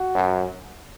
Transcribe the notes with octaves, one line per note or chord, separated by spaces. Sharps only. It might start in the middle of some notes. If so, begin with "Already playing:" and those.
Already playing: F#4
F#2